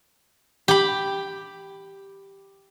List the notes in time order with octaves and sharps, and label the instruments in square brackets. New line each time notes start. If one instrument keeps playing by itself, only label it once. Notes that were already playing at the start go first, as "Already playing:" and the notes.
[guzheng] G4 B5